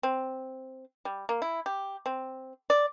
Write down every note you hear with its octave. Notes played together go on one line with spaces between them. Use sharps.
C4
G3
A#3
E4
G4
C4
D5